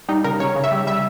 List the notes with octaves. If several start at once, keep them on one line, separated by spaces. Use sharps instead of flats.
G3 D#4
C#3 A#4
C#3 C#5
C#3
E5
G3
G3 E5